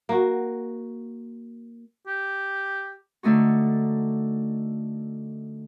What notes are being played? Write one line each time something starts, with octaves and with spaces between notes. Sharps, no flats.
A#3 F#4
G4
D3 A3 D#4 F#4